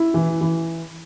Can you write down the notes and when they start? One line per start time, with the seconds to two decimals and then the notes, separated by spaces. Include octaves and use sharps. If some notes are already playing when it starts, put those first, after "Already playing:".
Already playing: E4
0.14 E3
0.41 E3